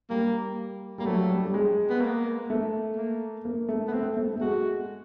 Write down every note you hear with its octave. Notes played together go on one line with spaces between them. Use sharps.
G3 A#3
G3 A#3
F#3 A3
G3
G3
G#3
B3
A#3
A3
A#3
A#3
A3
B3
A3 C4
A3
A3
G#3 F#4